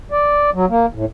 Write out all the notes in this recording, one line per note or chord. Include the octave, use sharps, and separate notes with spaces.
D5
F#3
A#3
A2